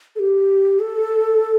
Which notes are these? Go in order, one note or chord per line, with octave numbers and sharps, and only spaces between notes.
A4
G4
A4